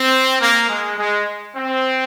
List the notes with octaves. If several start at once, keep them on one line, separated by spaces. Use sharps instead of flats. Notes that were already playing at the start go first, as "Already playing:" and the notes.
Already playing: C4
A#3
G#3
G#3
C4